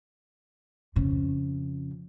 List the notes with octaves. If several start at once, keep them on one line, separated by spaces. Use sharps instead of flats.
F2 C#3